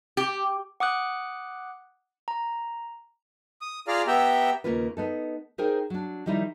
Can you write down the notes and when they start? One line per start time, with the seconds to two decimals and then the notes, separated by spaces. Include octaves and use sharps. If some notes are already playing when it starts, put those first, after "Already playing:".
0.17 G4
0.80 F#5 D6 D#6 F#6
2.28 A#5
3.62 D#6
3.88 F4 G#4 D5 F5 A#5 F6
4.07 B3 G4 E5 G5 A#5 E6
4.64 D#2 C#3 A#3 C#4 F4 B4
4.97 B3 D#4 A4
5.58 D#4 G#4 A#4 C5 G5
5.90 F#3 D4
6.26 D#3 F3 G3 D#4 E4